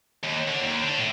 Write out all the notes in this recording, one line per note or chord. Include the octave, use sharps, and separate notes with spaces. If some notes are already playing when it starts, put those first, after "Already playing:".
D#2
D3
D#2
D3
A2